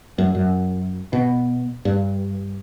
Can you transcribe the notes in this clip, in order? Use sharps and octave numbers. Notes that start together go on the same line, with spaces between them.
F#2
F#2
B2
G2